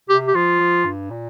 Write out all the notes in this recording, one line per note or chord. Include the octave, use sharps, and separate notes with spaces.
C3 G4
G4
F3 F4
F3
G2
A#2